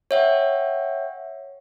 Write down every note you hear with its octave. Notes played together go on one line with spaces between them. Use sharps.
C#5 E5 F#5 G5